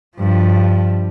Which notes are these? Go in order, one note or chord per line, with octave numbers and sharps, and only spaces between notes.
G2 F3